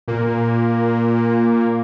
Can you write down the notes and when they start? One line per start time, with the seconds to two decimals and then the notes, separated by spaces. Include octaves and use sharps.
0.08 A#2 A#3